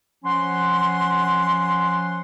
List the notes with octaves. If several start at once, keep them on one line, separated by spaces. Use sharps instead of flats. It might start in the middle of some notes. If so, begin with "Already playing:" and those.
F3 C#4 F#5 C6